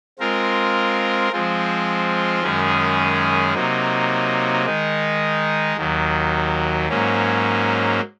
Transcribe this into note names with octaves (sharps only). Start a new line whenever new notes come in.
G#3 C4 F4 A#4
F3 G#3 C4 F4
F#2 D#3 G#3 C#4 G#4
C3 F#3 A#3 D#4
D#3 G#3 D#4
D#2 D#3 F#3
G#2 F#3 A#3 C#4